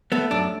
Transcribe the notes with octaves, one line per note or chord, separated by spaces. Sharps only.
A3 B3
F#2 D4